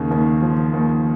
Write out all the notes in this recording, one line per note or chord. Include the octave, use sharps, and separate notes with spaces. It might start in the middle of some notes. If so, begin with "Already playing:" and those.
Already playing: D#2 C#3
D#2
F3
D#2